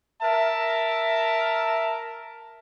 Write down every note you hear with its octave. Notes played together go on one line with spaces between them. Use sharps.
A#4 E5 A5